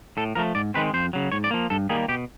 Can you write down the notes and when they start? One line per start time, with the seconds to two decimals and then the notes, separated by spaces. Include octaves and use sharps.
0.17 A2 A4
0.35 F3 A3 A#4
0.55 G#2 D5
0.74 D#3 G#3 C4 B4
0.94 F2 C5
1.13 C#3 F#3
1.32 G#2 C#5
1.44 D5
1.51 F3 A#3
1.70 G2 A4
1.89 D#3 G3 A#3 G#4
2.08 B2 G4